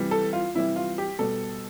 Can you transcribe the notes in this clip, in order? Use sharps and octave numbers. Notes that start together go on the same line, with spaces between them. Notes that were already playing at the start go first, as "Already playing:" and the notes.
Already playing: C3 E3 G3
A4
F4
C3 E3 G3 E4
F4
G4
B2 G3 A4